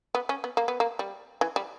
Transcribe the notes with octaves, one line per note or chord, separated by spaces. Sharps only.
B3
C#4
B3
A#3
B3
A#3
G3
E3
G3